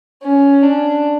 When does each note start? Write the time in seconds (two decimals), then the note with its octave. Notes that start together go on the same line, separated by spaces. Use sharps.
0.23 C#4
0.63 D4